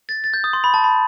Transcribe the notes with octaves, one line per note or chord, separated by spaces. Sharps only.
A6
A6
G6
D#6
C6
B5
A5
B5